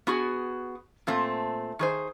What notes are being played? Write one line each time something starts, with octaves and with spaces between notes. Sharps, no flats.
B3 F#4 G#4
A#2 A3 C4
D#3 G#4 C5